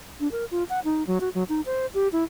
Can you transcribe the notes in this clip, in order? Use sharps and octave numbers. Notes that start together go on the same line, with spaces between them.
D4
A#4
F4
F#5
D#4
F#3
F#4
F#3
D#4
C5
G4
E4